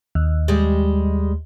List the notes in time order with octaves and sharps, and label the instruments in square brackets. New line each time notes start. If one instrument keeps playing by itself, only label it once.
[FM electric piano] D#2
[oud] G3 G#3